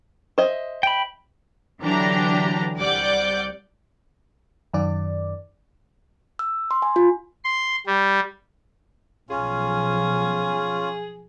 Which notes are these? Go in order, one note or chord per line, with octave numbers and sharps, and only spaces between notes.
C5 D#5 E5
G5 B5
D3 E3 F#3 D4 G4 A#5
C2 G3 D5 F#5 D6 G6
F#2 D#3 D5
E6
C6
G#5
F4
C6
G3
B1 F3 C#4 F4 G#4